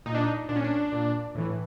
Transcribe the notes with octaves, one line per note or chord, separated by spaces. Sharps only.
A#2 D#4
D4
D#4
A#2 D4
C#4
D4
A#2
A2 E3